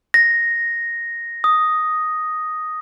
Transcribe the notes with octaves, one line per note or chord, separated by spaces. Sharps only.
A#6
D#6